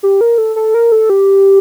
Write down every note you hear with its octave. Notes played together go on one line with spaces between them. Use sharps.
G4
A#4
A4
A4
A#4
A4
G4